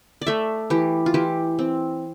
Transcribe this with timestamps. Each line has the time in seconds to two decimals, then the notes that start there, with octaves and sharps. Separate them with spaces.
0.22 D5
0.27 A3 E5
0.70 E3 G4
1.06 F4
1.14 E3 G4
1.59 C4